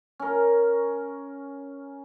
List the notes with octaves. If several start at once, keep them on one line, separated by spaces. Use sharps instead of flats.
C#4 A#4